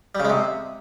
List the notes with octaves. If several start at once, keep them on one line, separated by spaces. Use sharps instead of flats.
G3
C#3
G#3
C3